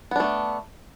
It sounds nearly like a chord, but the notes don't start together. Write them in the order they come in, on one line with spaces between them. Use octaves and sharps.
B3 D4 A3